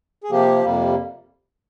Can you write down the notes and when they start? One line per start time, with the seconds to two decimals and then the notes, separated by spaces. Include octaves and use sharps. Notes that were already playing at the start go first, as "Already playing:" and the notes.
0.24 G#4
0.31 C3 F3 A#3 G4
0.63 F2 C3 G3 A#3